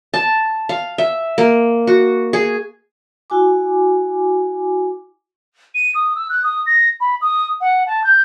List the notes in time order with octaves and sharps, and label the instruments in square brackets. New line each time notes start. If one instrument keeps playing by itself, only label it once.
[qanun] A5
F5
E5
A#3
F#4
G#4
[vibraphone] E4 F#4 G#5 D6
[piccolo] D#7
D#6
E6
F#6
D#6
A#6
B5
D#6
F#5
A5
G6